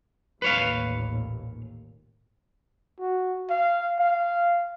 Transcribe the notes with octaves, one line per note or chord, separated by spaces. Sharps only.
A1 D#2 A#2 B4 C#5 F5
F#4
F5
F5